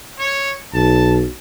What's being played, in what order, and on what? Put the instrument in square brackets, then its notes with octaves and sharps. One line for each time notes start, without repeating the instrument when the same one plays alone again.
[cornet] C#5
[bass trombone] B1 [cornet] A5